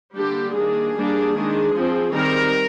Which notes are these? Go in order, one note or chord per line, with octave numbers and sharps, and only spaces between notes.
D3 G3 A#3 D4 G4
D#3 A#3 D4 G#4
G3 A#3 D4
D#3 G#3 D4
F3 C4
D#3 G3 C4 A#4